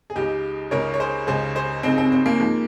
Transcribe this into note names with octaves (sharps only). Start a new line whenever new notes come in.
G#4
C#2 C#3 G#3 D#4 G4
C#2 C#3 G#3 A#4 C#5
C#5
G#4 C5
C#2 C#3 G#3 G#4 C5
G#4 C5
C#2 C#3 G#3 C4 D#4
C4
C4
A#3
G#2 F3 G#3